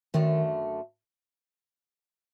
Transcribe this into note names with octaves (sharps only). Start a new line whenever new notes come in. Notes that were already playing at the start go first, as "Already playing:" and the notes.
F#2 D3 D#3 A3